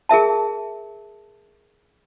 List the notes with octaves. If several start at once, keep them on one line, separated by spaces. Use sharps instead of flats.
G#4 A#4 E5 A5